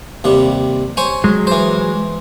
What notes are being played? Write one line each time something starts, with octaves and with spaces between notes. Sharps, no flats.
D#2 C3 G3
C5 C#5 G#5
F#3 G#3
E3 C5